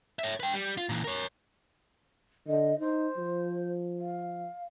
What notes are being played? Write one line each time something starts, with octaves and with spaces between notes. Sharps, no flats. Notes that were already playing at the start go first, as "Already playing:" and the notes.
C#5 E5
B4 G5
G3
F4
A#2 E3
A#4 C#5
D3 D#5
D#4 C5
F3
F5